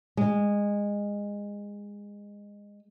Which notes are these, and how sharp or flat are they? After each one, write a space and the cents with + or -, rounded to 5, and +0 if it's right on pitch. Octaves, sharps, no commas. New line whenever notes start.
G#3 -20